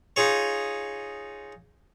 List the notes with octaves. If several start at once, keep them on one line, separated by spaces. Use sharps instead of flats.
D#4 F4 G#4 C#5